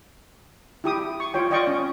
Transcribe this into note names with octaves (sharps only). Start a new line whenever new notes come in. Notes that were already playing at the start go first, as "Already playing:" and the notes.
E4 G4 D#6
C#6
F4 C#5 G5
F4 D5 D#5 G5 C#6
C#4